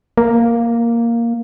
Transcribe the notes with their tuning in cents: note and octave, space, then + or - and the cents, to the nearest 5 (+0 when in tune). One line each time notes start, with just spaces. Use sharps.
A#3 +0